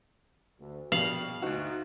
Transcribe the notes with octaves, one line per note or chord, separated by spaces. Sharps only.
D2
A#1 B2 G3 F5 F#7
D2 D#4 F#4